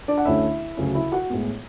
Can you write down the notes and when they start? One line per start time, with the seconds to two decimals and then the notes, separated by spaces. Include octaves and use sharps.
0.08 D4 D5
0.18 F#5
0.25 D2 D3 A3 C#4 E4 E5
0.77 D2 C#3 F#3 C#4
0.95 E4 E5
1.12 F#4 F#5
1.30 A2 G#3 B3